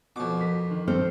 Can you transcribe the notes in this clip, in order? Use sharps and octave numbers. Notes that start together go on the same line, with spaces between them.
F2 B2 F3 D6
A#4 B6
D#3
C4 A4 C5 F6